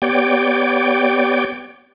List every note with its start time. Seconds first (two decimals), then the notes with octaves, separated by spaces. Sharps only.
0.02 B3 G4 C#5 D5 G5